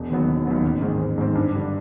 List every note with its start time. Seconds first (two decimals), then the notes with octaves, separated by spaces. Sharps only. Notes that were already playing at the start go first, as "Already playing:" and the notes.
Already playing: E1
0.10 D#2 D#3 F#3 B3
0.28 E1
0.46 D#2 D#3 F#3 B3
0.64 A1
0.81 G#2 D#3 G#3 C4
0.99 A1
1.18 G#2 D#3 G#3 C4
1.35 G2
1.54 D3 G3